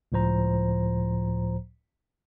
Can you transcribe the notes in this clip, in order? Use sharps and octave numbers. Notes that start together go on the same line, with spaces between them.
C#2 A2 F3 C5 A#5